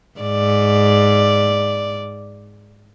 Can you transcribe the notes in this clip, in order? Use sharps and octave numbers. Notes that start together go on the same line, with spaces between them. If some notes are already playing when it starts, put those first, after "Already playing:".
G#2 D5